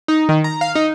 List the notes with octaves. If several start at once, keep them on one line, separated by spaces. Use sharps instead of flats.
D#4
D#3
A#5
F5
D#4